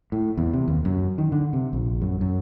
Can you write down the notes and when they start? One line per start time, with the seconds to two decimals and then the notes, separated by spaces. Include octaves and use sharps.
0.12 A2
0.37 E2
0.53 C3
0.68 D#2
0.85 F#2
1.18 D#3
1.32 D3
1.53 C3
1.73 A#1
2.01 F#2
2.21 F#2